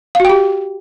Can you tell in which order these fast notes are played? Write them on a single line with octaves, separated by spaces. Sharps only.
F5 F#4 G5 G4